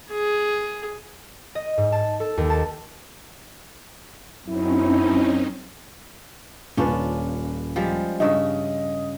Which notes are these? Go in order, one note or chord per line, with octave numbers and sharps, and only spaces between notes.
G#4
D#5
G#2
A5
A4
D#2
A5
F#2 C4 C#4 D#4 E4
D#1 C#4 D4 F4 B4
F3 G3 G#3
G2 C#3 D#5 E5